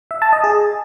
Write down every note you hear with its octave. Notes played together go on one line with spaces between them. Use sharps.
E5
A5
D#5
G#4